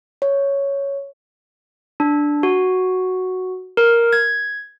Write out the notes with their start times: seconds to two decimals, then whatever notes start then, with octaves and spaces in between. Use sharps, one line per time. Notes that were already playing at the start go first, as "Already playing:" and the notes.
0.22 C#5
2.00 D4
2.43 F#4
3.77 A#4
4.13 G#6